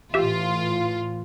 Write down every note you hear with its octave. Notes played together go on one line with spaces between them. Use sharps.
A2 E3 F4 G4 E5